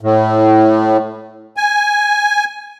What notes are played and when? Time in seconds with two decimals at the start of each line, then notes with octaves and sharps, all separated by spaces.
0.01 A2
1.57 G#5